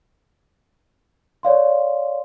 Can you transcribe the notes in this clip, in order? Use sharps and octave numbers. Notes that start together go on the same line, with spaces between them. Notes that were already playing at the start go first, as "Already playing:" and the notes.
C#5 D5 F5 C6